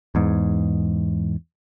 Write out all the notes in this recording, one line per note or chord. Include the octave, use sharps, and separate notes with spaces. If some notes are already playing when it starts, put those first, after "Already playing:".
E2 G#2